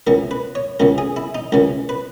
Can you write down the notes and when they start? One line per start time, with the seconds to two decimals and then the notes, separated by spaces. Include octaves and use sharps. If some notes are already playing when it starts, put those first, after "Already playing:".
0.07 C#2 C#3 E3 A#4
0.31 B4
0.55 C#5
0.80 C#2 C#3 E3 A#4
0.98 G#4
1.16 E4
1.35 D#4
1.52 C#2 C#3 E3 A#4
1.89 B4